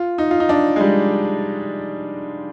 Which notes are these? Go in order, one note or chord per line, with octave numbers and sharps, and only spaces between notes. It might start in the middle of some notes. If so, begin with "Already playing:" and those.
Already playing: F4
D#4
F4
D#4
D4
G#3
G3